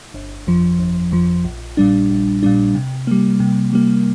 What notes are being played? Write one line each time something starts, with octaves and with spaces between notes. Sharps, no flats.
G1
F2 F3
G1
F2 F3
A#1
A#2 G3 D4
A#1
A#2 G3 D4
C3
G3 A#3
C3
G3 A#3